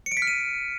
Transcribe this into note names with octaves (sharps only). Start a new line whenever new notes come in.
C#7
D7
B6
F6
D#7